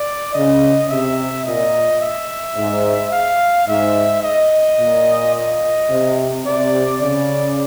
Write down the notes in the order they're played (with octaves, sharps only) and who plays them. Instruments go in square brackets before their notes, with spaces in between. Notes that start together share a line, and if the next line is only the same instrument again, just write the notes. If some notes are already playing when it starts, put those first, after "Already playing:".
Already playing: [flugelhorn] D5
[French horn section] C#3 [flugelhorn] D#5
[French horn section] C3 [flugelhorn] E5
[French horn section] A#2 [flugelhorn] D#5
[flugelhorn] E5
[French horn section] G#2
[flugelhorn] F5
[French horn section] G#2 [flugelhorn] E5
[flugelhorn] D#5
[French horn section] A#2
[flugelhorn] D#5
[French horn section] C3
[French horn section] C3 [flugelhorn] D5
[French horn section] C#3 [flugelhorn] D5